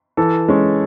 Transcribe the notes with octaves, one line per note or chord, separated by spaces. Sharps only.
E3 A4
G#3 C#4